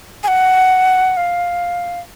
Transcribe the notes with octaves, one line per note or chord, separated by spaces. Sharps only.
G#5
F#5
F5